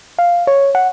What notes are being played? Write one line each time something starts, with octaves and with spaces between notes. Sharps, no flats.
F5
C#5
F#5